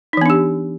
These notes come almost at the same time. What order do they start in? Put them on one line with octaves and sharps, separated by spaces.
D#4 E3 B3 D4 G4